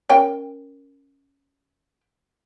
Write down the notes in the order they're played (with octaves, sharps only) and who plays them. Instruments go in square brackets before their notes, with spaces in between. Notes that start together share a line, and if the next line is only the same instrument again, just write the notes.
[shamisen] C#4 A#4 G5